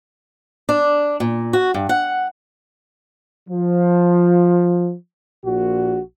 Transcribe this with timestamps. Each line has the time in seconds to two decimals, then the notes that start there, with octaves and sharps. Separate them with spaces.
0.69 D4
1.20 A#2
1.53 F#4
1.74 G2
1.89 F#5
3.49 F3
5.44 A#1 A#2 F#4